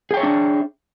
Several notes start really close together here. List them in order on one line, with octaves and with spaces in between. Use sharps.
G#4 G5 C#5 E5 D4